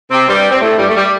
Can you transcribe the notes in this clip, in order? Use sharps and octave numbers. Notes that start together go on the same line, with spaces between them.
C3 C4
G2 G3
C4
A2 A3
G2 G3
A3
G3